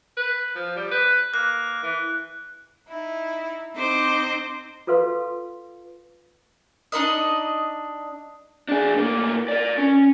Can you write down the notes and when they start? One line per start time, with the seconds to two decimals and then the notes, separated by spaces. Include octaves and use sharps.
0.17 B4
0.55 F3
0.76 G3
0.91 B4
1.34 A#3 F#6
1.83 E3
2.87 D#4 E4
3.74 C4 D#4 C5 D#5 D6
4.87 F4 A4 B4 F5 C6
6.92 D4 D#4 B4 D#5
8.69 D4 G#4
8.94 A2 A#3
9.49 A#4 D5
9.78 C#4